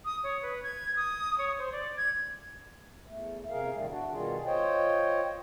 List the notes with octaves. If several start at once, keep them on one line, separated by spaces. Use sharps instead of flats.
D#6
C#5
B4
G#6
D#6
C#5
C5
D5
G#6
E2 A3
E2 C3 G#4 A#4 F5
A2 D3 D#3 G3 A3
F2 D4 F#4
B2 D#3 G3 F4 G#4
F4 C5 C#5 D#5 G5